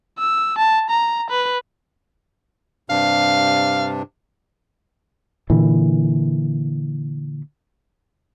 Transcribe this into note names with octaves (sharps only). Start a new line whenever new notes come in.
E6
A5
A#5
B4
G2 C3 D4 F5
A#2 D3 E3